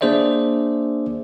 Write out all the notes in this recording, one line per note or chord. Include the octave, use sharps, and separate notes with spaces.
A#3 D4 G#4 C5 D5 E5